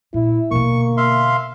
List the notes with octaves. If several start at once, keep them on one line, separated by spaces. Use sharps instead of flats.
A#2 E4
B2 D3 A#3 C#6
E5 F5 C6